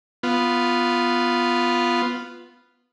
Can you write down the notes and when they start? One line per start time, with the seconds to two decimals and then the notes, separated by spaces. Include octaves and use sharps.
0.23 B3 F4